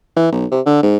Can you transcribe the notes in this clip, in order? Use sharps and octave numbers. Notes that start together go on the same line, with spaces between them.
E3
B1
C3
D3
G#2